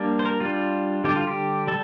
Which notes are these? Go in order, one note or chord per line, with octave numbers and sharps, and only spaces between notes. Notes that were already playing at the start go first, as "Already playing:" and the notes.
Already playing: G3 A#3 D4
C5
A#4
G3 D4 F4
D3 G3 D4 G4
F4
G4
G3 A4